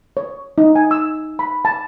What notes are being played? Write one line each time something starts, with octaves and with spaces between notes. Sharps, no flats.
C#5
D#4
G#5
E6
B5
A5